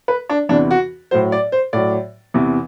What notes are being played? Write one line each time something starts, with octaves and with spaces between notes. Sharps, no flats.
B4
D4
E2 C3 E3 D4
F#4
A2 F#3 C5
D5
C5
A2 F#3 D5
E2 C3 E3